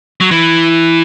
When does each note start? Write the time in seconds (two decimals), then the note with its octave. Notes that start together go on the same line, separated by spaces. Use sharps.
0.20 F#3
0.31 E3